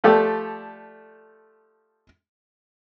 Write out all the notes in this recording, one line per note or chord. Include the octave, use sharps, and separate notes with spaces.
F3 A3 G4 A4 D5